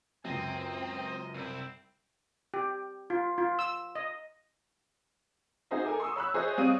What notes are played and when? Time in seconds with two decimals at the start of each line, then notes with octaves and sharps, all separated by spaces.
0.25 C#2 F#2 C4 G#4 D#5 G#5
0.62 D#5
1.34 C2 C4 E4
2.54 G4
3.10 F4
3.38 F4
3.59 E6
3.95 D#5
5.71 D#4 F#4 G#4 C5 D#5 E5
5.85 A4 A#4 G#5 D6
6.00 C6 C#6 D#6 E6
6.16 C#5 B5 E6 F#6
6.34 G#4 C5 C#5 D#5 E5 G#5
6.58 G3 C4 C#5 F5 D#6 D#7